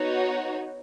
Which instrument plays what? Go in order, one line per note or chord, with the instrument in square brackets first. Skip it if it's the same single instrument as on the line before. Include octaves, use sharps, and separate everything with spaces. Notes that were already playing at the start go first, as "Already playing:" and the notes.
Already playing: [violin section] B3 D#4 F#4 C#5